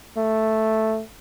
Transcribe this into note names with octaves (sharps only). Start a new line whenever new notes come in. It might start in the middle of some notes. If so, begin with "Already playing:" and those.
A3